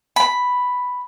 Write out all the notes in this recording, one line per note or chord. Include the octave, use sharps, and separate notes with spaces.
B5